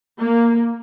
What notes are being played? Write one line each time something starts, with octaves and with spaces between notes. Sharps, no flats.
A#3